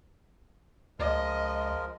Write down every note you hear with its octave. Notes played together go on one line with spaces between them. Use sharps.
C#2 F3 G#3 A#4 D#5